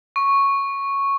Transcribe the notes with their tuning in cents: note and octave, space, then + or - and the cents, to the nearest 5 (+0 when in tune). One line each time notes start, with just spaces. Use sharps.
C#6 -5